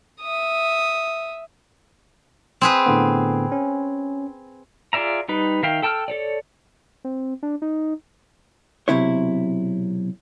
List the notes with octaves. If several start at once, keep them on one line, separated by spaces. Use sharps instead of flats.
E5 D#6
C4 G#4 B4
A2 D3 B3
C#4
F4 G#4 D5 E5 A#5
G3 D#4 B4
D#3 E5 F5 G5
A4 G5 A5 E6 F6
A4 C#5 D5
C4
D4
D#4
B1 F2 C3 E4 C#5